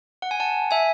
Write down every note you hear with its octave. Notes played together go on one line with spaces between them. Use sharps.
F#5
G#5
F#5 A5
E5 G#5